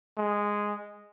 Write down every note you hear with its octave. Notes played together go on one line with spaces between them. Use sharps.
G#3